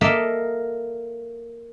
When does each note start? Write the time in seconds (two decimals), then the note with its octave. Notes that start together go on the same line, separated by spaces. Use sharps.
0.01 A#3 A4 A#4 D#5 E5